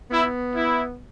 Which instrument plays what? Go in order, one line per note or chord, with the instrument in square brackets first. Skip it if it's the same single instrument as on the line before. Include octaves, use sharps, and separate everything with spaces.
[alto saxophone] B3 [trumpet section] E4
[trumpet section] E4